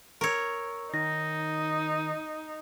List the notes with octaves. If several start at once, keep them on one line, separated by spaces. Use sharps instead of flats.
A#4 C#5 C#6 E6
D#3 D#4 A#6